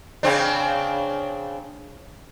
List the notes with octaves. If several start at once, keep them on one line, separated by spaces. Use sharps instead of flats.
C#3 C4 D4